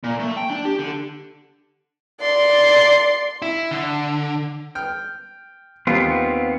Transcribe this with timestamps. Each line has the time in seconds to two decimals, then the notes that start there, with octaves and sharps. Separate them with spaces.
0.04 A#2
0.19 A3
0.37 G5
0.50 D4
0.65 G4
0.79 D3
2.20 D5 C6
3.42 E4
3.71 D3
4.75 G5 F6
5.87 D#2 B3 C4 F4